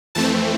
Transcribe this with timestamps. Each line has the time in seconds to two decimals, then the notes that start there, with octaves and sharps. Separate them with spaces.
0.15 F2 E3 A3 C4 A5